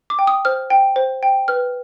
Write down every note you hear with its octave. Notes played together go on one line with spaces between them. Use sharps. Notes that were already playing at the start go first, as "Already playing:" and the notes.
D6
G5
D#6
C5 F6
G5
C5
G5
B4 F6